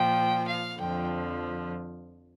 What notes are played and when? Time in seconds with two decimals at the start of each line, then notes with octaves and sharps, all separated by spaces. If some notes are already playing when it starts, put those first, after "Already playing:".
Already playing: A#2 F3 G5
0.48 F5
0.77 F2 D3 F3 G5